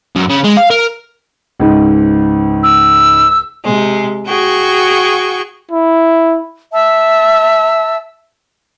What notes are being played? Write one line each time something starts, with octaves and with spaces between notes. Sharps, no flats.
F#2
C#3
G#3
F5
A#4
C#2 G#2
E6
C3 G#3
F#4 G#4 G5 C#6
E4
E5 A5 E6